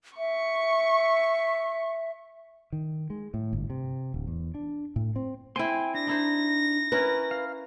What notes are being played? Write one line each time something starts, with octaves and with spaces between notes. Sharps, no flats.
E5 C#6
D#3
G#3
A2
G1
C3
D1
E2
D4
A2
C4
C4 E4 G5 G#5 C6
D4 A#6
D#4 E4 C5
C#4 E4 A#4 B4
F5